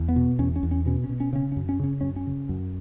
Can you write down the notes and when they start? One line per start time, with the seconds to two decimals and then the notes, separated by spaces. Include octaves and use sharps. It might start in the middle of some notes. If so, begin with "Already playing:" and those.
Already playing: E2
0.09 B3
0.16 B2
0.39 E2 C#4
0.56 C#4
0.63 E2
0.71 C#4
0.86 B2 C#4
1.04 C#4
1.09 B2
1.20 C#4
1.33 C#3 C#4
1.52 C#4
1.56 F#2
1.69 C#4
1.79 C#3 C#4
2.01 F#2 C#4
2.16 C#4
2.27 C#3
2.49 F#2